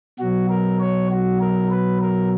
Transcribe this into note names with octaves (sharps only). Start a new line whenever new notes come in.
B2 F#3 F#4
A#4
C#5
F#4
A#4
B4
A#4